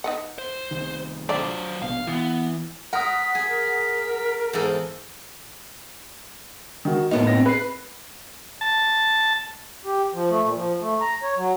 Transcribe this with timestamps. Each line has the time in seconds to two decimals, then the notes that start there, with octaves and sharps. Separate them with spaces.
0.04 D#4 B4 F#5
0.38 C5
0.71 C2 D#3
1.29 F3 F#3 D4 C5 D5
1.82 A#1 B2 F5
2.07 E3 B3
2.93 A#4 F#5 D#6 B6
3.35 G#4
3.47 A#4
4.53 E2 G#2 A4
6.85 D#3 F#4
7.11 A2 A#3 B3 D#4
7.27 C4 A#6
7.46 B4 C7
8.61 A5
9.83 G4
10.14 F3
10.30 A3
10.42 A#2
10.55 F3
10.80 A3
11.01 A#5
11.23 C#5
11.37 F#3